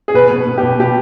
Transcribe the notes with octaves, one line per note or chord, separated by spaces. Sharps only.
G#4
B2 B4
B2
B2
G4
B2
B2 G4